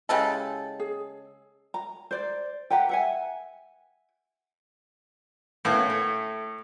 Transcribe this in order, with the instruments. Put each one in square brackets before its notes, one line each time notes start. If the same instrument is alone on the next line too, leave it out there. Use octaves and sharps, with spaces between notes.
[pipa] C#3 G#3 A4 [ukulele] E4 G4 G#5
[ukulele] G#4
A#5
C5 D5
G4 B4 F#5 A#5
E5 F#5 G#5
[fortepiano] A2 [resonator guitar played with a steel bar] A#3 B3 C#4
[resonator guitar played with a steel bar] A3